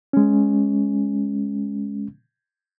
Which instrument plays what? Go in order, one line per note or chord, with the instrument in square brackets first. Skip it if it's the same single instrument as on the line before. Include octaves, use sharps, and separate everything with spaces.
[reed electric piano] G#3 C#4